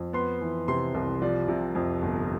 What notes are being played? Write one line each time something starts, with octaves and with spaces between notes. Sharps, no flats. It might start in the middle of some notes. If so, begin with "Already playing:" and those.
Already playing: F2
B3 C6
E3
C3 C6
C2
F3 D5
C3
F2
G1